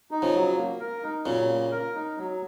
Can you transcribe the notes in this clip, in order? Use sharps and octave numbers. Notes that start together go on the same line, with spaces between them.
D#4
C#3 F3
F#3
A#3
A#4
D#4
A#2 C#3 F#3
A#3
A#4
D#4
F#3